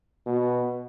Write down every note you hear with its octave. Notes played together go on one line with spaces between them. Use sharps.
B2